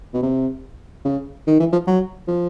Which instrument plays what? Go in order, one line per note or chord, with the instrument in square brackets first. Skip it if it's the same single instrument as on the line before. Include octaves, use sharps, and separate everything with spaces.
[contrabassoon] B2
C3
C#3
D#3
E3
F3
F#3
F3